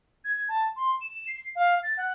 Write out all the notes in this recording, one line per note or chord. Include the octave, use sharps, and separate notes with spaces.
G#6
A5
C6
E7
C7
F5
A6
F#5